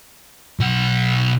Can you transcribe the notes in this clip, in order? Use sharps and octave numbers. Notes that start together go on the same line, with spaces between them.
B1 F#5